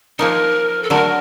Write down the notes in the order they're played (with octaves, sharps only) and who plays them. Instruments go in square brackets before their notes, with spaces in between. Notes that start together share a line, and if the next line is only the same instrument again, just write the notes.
[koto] F3 A#3 D#4 [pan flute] A#4
[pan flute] A4
[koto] D3 F#3 A3 [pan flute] A#4